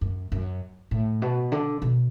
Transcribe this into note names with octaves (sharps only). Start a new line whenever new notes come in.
F#2
F#2
A2
B2
D3
B2